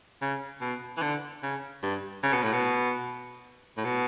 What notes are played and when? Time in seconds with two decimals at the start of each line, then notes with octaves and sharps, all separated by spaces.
0.22 C#3
0.61 B2
0.97 E3
1.02 D3
1.43 C#3
1.83 G2
2.23 C#3
2.33 B2
2.43 A2
2.53 B2
3.77 A2
3.85 B2